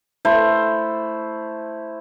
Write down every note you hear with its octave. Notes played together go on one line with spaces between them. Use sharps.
A3 E4 C5